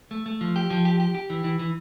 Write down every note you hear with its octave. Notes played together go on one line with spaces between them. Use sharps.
A3
A3
F3
G4
F3
G4
G4
G4
E3
E3
E3